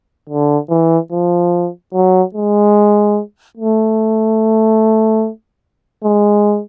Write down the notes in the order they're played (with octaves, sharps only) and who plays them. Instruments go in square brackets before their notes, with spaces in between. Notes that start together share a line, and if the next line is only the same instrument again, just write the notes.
[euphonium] D3
E3
F3
F#3
G#3
A3
G#3